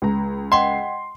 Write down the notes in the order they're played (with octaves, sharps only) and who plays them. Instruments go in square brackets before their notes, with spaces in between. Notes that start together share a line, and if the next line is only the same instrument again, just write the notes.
[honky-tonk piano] C#2 A#5
[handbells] D#5 F#5 G5 [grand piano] C6